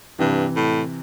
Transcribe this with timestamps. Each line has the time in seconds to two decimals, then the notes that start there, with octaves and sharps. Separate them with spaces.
0.19 G2 C3 E3
0.56 A2